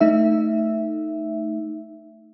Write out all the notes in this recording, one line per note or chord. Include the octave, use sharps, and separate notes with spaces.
A3 D#4 E5